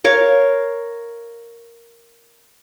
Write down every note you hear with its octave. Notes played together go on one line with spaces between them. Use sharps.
A#4 C#5 F5